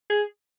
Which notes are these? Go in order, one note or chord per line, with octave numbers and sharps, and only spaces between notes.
G#4